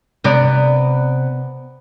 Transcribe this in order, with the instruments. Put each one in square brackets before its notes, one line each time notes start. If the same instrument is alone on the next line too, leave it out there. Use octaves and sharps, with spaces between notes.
[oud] C3 B3 D5